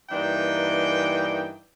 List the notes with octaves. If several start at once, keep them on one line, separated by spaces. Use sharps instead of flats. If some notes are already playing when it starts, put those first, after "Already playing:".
G2 E3 A#3 D4 D#4 G5